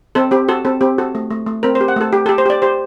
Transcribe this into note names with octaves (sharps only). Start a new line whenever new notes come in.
C4 A4
C4 G4
F#4 A4
C4 A4
C4 G4
F#4 A4
A3
A3
A3
C4 A#4
C5
G4
F#5
A3 A4
G4
G4 A4
C5
G4 D5
G4 C5